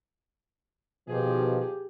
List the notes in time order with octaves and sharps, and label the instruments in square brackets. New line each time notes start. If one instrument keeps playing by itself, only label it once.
[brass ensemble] B2 D#3 F3 [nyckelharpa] G4 G#4